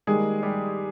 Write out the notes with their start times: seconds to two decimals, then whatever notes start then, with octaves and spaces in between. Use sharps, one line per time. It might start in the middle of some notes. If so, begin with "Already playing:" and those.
0.07 D#3 G3 G#3 A#3 G#4
0.43 G3 G4